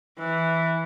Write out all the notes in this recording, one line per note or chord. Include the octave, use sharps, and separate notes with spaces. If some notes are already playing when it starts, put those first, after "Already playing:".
E3